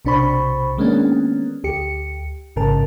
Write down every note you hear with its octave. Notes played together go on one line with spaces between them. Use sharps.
B1 C3 D4 C5 B5 C#6
D#3 G#3 A#3 B3 C#4 D4
D2 G4 C#7
A1 G#2 C#3 A#4 A5